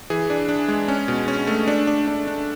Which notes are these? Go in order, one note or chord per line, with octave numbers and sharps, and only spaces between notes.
E3 G#4
D4
D4
G#3
C#4
B2
C#4
A3
D4
D4
D4
D4